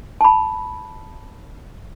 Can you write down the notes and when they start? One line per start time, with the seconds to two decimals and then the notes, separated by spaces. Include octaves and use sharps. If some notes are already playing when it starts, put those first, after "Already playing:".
0.21 A5 B5